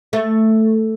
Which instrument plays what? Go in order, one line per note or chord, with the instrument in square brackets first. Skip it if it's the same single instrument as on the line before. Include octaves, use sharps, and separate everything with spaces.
[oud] A3